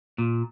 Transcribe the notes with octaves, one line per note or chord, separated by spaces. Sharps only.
A#2